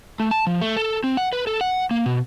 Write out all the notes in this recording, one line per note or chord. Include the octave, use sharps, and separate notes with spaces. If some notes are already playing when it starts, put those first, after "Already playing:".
A3
A5
F3
A3
A4
C4
F#5
B4
A4
F#5
A#3
B2